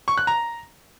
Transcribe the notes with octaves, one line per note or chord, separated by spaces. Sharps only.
C#6
F#6
A#5